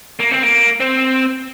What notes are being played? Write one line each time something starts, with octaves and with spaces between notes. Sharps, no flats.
A#3
C4
A#3
C4